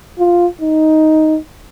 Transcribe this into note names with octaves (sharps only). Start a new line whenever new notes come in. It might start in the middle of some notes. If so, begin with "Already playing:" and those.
F4
D#4